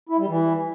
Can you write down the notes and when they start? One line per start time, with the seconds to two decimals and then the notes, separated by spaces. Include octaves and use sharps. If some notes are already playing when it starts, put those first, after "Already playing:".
0.09 E4
0.18 G3
0.28 E3